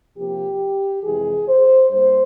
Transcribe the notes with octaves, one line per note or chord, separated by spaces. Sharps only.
C3 F3 A#3 G4
F2 C3 E3 G#3 G#4
C5
G2 G3 A#3 C5